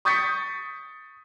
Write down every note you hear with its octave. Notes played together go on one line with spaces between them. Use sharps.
C#6 D#6 G6 A6 B6 C#7